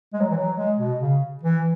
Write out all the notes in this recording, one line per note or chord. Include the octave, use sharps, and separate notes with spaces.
G#3
F#3
E3
F#3
G#3
B2
C#3
E3